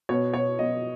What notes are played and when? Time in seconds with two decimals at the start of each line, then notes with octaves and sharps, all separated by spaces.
0.09 B2 C#5
0.34 B2 C#5
0.59 B2 D#5